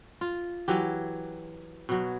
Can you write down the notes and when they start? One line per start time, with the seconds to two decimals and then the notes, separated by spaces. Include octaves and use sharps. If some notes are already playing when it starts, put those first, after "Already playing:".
0.21 F4
0.68 E3 F#3 G4
1.89 B2 F#3